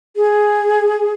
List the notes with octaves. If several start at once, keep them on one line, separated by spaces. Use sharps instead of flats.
G#4